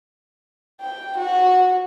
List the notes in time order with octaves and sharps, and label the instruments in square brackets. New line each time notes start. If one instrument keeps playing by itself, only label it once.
[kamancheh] G5
F#4